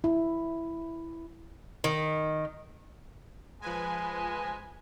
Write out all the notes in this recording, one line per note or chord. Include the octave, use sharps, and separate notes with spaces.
E4
D#3
F3 G#3 B4 G#5